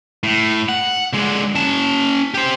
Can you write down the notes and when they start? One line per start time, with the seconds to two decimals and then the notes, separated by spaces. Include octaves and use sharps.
0.23 A2
0.69 F#5
1.13 D3 G#3
1.55 C#4 A5
2.34 G4 C5